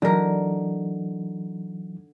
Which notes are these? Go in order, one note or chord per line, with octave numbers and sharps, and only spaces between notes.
D3 E3 F#3 D#4 A#4